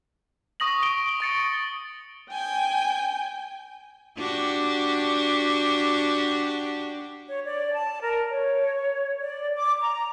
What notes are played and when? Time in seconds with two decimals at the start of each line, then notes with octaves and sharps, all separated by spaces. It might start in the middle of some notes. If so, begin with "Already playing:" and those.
0.60 C#6 D#6 A#6 F#7
0.82 C#6 D7 G7
1.09 G7
1.20 C#6 A6 C#7
2.29 G5 G#5 G6
4.18 D4 F#4 G4
7.28 C#5
7.44 D5
7.74 A5
8.02 A#4
8.30 C#5
9.21 D5
9.55 D6
9.81 A#5